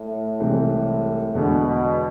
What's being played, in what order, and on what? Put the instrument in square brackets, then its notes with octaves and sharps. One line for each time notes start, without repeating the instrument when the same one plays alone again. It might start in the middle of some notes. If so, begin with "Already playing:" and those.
Already playing: [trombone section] A2
[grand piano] C2 C3 E3 G#3 C4
[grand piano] E2 D3 G#3 [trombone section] B2
[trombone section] B2